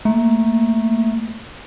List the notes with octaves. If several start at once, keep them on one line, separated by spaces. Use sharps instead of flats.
A3 A#3